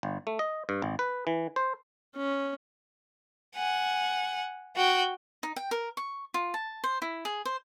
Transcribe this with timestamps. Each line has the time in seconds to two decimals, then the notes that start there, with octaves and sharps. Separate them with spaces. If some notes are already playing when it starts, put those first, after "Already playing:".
0.03 G1
0.27 A3
0.39 D#5
0.69 G2
0.82 G#1
0.99 B4
1.27 E3
1.56 C5
2.16 C#4
3.55 F#5 G#5
4.76 F#4 G5
5.43 D#4
5.56 G5
5.71 A#4
5.97 C#6
6.34 F4
6.54 A5
6.84 C5
7.02 E4
7.25 G#4
7.45 C5